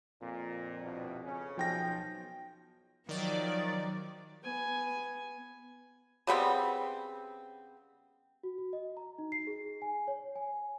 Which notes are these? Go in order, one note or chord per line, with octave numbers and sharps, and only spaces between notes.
F2 A#2
C2 G2 B2
C#3 C#4
B1 F3 G5 A#6
D#3 F3 F#3 D5
B3 G#5
C#3 G3 B3 C4
F#4
F#4
D#5
A#5
D#4
C7
G#4
G#5
C#5
G#5